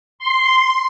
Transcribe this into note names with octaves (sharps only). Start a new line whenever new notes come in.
C6